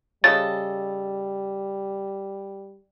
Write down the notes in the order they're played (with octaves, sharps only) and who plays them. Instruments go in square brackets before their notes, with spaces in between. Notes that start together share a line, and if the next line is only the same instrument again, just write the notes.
[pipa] C#3 A4 D#5 [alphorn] G3 [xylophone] A6